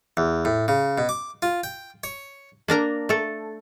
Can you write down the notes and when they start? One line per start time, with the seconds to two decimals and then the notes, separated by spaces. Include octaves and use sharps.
0.17 E2
0.45 A2
0.68 C#3
0.98 B2
1.09 D6
1.42 F4
1.64 G5
2.04 C#5
2.68 A#3 D4 A#4 A#5
3.09 A3 A4